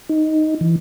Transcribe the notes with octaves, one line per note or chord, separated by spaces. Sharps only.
D#4
E3